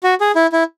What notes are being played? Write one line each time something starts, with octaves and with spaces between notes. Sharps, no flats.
F#4
G#4
E4
E4